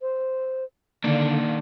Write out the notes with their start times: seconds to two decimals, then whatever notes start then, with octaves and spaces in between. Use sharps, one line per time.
0.01 C5
1.04 D3 D#3 A#3 D4